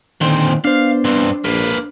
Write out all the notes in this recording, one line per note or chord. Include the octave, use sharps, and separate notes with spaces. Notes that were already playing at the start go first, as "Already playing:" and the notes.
A#2 D3 D#3 C4 C5
B3 D4 C5 F5
G2 C4
A#1 A#3 B4